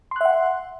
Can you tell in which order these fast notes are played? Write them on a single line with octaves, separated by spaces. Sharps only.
C6 F#6 E5 F#5